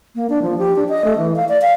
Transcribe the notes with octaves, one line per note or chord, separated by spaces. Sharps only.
A#3
D4
F3
G4
D4
D#5
A3
E3
F5
D5
F5